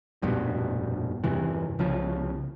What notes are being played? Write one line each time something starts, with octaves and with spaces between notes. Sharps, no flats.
F1 A#1 G2 B2
E2 G2 C3 E3
C2 C#3 F3